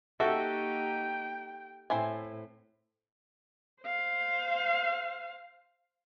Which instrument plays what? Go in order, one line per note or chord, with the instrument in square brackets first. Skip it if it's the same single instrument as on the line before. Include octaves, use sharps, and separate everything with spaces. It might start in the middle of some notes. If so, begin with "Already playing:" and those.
[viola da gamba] A#3 D#4 G4 [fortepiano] F#4 A4 [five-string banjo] E5 [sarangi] G5
[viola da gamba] A2 [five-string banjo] C4 E4 G#5
[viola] C5 F5